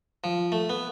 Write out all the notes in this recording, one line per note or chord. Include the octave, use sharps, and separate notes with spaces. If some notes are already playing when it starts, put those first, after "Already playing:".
F3
A3
B3